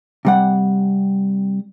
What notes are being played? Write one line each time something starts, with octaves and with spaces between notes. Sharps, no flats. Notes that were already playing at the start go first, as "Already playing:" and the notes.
C3 G3 F#5